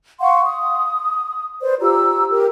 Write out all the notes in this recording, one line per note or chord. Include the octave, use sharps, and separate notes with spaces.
F5 F#5 C6 C#6
D#6
B4 C5 D5
F4 G4 A#5 E6
G4 A#4